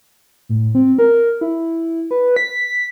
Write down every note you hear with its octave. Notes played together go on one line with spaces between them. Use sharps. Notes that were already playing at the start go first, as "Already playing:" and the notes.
A2
C4
A#4
E4
B4
B6